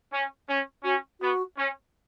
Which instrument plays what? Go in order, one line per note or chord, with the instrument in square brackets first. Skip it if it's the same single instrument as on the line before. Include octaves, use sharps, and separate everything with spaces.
[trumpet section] C#4
C#4
[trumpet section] C#4 [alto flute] F#4
[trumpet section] B3 [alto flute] F#4
[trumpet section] C#4